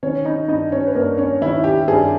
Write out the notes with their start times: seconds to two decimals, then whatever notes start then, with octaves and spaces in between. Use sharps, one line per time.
0.03 D#3 C#4 C#5
0.25 D#4 D#5
0.48 G2 D#4 D#5
0.72 C#4 C#5
0.86 B4
0.95 G2 A#3 A#4
1.18 C#4 C#5
1.42 D#3 E4 E5
1.64 G4
1.87 G2 G#4